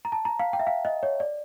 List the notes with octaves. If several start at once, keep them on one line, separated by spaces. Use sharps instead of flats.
A#5
A5
A#5
F5
G5
E5
F5
D#5
C#5
D5